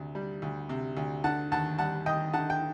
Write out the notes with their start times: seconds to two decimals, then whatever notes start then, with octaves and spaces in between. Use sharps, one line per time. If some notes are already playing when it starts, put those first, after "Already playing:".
Already playing: D2 C3
0.15 G3
0.42 D2
0.69 C3
0.97 D2
1.24 D3 F#5 A5
1.52 D#2 F#5 A5
1.78 G3 F#5 A5
2.06 D#2 D#5 G5
2.33 D3 F#5 A5
2.50 G5